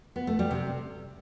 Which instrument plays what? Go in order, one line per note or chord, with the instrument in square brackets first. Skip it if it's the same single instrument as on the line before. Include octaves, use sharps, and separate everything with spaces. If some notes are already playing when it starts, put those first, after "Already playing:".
[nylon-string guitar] B3
A3
G3
C3